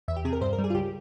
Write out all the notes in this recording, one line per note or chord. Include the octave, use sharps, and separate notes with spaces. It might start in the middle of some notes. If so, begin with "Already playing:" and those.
E2 E5
G4
C3 G#4
A#4
G2 C5
A#4
G3
G#4
F4
C#2 G4